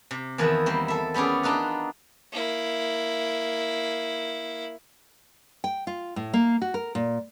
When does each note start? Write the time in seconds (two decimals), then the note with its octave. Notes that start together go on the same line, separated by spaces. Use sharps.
0.11 C3
0.38 E2 D#3 F3 E4 G#4 B4
0.66 G3 A#3 C4
0.88 A4 E5
1.14 G3 B3 C#4 G#4 D5
1.43 D4 D#4 F4 B4
2.32 A#3 E4
5.64 G5
5.87 F4
6.16 A2
6.33 A#3
6.62 F#4
6.74 A#4
6.95 A#2